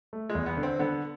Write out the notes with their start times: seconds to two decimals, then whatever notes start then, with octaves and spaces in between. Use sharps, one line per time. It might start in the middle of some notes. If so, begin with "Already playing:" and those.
0.13 A3
0.30 G#3
0.35 E2
0.46 B3
0.57 D3
0.63 C4
0.79 D3 B3